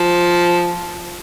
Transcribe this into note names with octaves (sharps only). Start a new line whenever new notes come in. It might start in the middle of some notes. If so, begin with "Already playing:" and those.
Already playing: F3